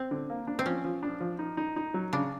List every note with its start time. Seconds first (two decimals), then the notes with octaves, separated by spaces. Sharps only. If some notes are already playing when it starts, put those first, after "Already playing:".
Already playing: C4
0.11 D3
0.30 A#3
0.47 D4
0.59 C4
0.66 F3 C#4
0.84 F3
1.03 D4
1.20 F3
1.39 D#4
1.57 D#4
1.76 D#4
1.94 F#3
2.13 C#3 D4